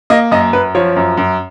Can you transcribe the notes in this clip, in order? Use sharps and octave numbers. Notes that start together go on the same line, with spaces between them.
A#3 D#5
F#2 D#5
F#2 B4
F3 C#5
F#2
F#2